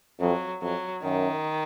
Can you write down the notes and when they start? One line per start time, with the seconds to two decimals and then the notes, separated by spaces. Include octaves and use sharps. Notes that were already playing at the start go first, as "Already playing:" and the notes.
0.21 F2 F#3
0.62 F2 F#3
1.03 F#2 D#3